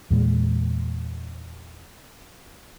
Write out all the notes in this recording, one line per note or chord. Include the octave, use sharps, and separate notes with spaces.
E2 A#2 G#3